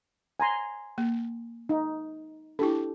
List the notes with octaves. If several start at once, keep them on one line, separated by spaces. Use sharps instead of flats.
G#5 A#5 C6
A#3
D#4
D4 E4 G4 A4